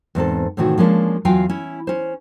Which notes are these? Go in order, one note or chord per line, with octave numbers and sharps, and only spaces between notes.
E2 G#2 C4 A4
A2 C3 D#3 E3 F#4
F3 G#3 A#3 C#4 D4
E2 F#3 F4 F5 G5 G#5
C#4 E4
C#4 C5